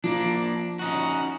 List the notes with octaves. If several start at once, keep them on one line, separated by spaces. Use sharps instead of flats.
F3 A#3 D4
C#4 D#4 F#4